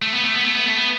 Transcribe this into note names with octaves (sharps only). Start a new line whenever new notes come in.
A3
B3
A3
B3
A3
B3
A3
B3